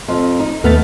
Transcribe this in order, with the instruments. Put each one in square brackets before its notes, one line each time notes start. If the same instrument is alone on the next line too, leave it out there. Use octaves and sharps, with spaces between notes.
[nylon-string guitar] F2
D#4
[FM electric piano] D#2 F6 A6 [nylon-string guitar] A3 B3